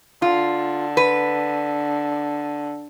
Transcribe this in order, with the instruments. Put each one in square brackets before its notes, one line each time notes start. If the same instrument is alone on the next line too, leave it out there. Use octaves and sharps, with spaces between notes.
[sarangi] D3 [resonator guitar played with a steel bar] F4
[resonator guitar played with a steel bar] B4